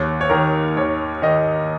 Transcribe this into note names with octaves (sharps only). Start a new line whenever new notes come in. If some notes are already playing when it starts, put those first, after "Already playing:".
Already playing: D#2 C#5
C#5
D#3 A#4
D#2 C#5
D#3 D#5